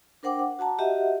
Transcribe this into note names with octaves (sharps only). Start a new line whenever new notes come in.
D4 A#4 C5 F#5 G5 D6
F#5
F#4 F#5 A5 A#5
F#4 G4 D#5 E5 F#5